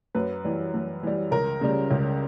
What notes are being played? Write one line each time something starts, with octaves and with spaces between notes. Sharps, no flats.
F#2 B4
E3 G3
F#2
E3 G3
C#2 A#4
C#3 G3
C#2